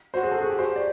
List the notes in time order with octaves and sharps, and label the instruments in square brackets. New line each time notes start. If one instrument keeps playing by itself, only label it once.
[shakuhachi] F#4 [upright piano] C5
[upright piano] G#4
A4
G#4
G4
C5
D5